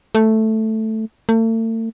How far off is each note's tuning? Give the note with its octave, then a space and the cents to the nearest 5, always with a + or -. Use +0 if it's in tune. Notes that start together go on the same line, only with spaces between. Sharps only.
A3 +0
A3 +40